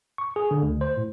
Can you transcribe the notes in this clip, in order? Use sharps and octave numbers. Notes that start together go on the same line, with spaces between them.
C#6
G#4
D3
D2
C5
A2